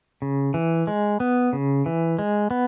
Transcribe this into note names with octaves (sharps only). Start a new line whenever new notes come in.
C#3
E3
G#3
B3
C#3
E3
G#3
B3